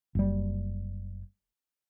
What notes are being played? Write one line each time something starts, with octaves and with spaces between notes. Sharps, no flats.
F#1 G3